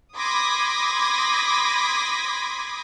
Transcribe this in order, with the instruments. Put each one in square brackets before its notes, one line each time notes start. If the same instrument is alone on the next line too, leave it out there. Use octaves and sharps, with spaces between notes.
[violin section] B5 C6 D6 D#6 G#6 A#6